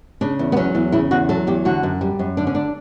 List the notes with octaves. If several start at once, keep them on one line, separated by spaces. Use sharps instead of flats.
C#3 D4
E2
B3
F#3 C#4
E2
C#3 E4
E2 F#4
F#3 A4
E2 G4
D3 F#4
F#2
G3
F#2
D3 D4
C#4
D4